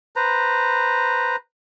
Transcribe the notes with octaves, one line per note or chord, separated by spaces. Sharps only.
B4 C5 A#5